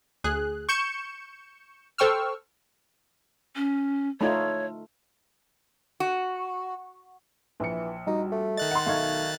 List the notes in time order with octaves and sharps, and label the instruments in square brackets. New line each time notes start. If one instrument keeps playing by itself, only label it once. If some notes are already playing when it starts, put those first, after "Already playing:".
[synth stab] D2 G#4 F#6
C#6 G6 C#7 E7
A4 C5 G5 C#6 E6 F6
[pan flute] C#4
[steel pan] A3 D#4 F4 [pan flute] C#5
[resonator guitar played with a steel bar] F#4
[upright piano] A#1 C#7 [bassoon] E3
[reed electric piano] G3 F#4 [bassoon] D#4
[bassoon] A3
[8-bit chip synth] D#3 F#6 A6 [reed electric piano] D#5
[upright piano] F#5 C6
[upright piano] B1 D#4 G#6 [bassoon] A3 [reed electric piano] F5 C#6